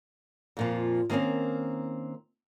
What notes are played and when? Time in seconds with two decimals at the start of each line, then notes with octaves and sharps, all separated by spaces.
0.57 F2 A#2 F3
1.10 D#3 A#3 C4 C#4 D#4